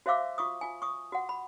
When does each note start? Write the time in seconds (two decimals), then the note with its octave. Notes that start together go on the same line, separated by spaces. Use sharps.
0.06 F#4 C5 E5 F5 D6 E6
0.38 F4 C#6 D#6
0.61 F4 G#5
0.82 C#6 D#6
1.12 F#4 F#5
1.29 B5